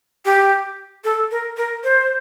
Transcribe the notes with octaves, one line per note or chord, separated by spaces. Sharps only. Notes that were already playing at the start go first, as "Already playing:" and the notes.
G4
A4
A#4
A#4
C5